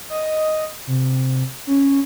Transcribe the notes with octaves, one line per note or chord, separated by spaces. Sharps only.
D#5
C3
C#4